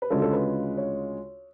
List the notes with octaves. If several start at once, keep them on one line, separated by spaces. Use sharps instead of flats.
B4
D2 C#3 G#3 C#4 F4 A4
A4
B4
C#5